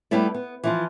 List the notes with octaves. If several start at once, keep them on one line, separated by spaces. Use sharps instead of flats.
G3 A3 B3 E4 D5
B3
E3 F3 F4